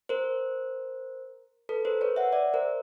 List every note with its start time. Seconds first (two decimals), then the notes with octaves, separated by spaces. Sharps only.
0.09 A#4 C5
1.69 A4 B4
1.85 A#4 C5
2.01 B4 C#5
2.16 E5 F#5
2.32 D5 E5
2.54 A#4 C5